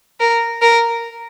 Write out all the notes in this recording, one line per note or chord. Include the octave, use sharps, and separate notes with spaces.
A#4
A#4